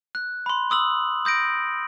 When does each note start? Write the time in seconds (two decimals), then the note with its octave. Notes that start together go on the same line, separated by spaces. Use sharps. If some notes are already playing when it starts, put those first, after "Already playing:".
0.15 F#6
0.46 B5 C6
0.70 C6 D#6 E6 F#7
1.25 D#6 G6 A#6 D7